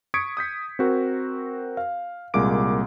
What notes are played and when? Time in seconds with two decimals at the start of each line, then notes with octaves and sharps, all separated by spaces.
0.14 C#6 D#6 G#6 B6 C#7 D7
0.37 D#6 G6 B6
0.79 C4 F#4 A#4
1.77 F5
2.34 C2 A#2 G#3 A#3 D6 D7